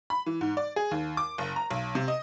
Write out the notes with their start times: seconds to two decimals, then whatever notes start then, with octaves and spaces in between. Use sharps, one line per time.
0.10 B5
0.26 E3
0.41 G#2
0.57 D5
0.76 G#4
0.91 D#2
1.17 D6
1.38 F#1
1.56 A#5
1.71 B1
1.95 C3
2.08 D#5